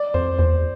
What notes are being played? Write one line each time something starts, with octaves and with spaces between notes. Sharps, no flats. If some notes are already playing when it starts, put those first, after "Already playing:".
Already playing: D5
F2 C5
E2 C5